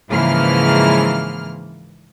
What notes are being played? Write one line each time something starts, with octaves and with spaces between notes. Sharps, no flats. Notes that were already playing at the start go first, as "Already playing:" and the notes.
G#2 C#3 E3 F3 A#3 F6